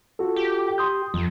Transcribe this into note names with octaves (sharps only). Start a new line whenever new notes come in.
F4 F#4 A4
G4
C6 D#6 G6
F2 F3